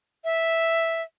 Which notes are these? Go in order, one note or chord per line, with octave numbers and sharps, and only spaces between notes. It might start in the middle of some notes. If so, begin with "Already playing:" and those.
E5